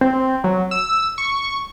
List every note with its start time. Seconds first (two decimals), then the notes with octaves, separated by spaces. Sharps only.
0.01 C4
0.44 F#3
0.71 E6
1.18 C#6